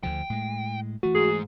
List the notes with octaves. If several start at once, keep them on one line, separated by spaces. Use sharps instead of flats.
D2 D3 F3 G5
A2 G#3
E3 A3 F#4
G#2 G#4